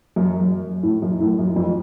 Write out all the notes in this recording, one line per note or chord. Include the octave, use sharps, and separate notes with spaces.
F#2
F#2
A2
F#2
A2
F#2
F2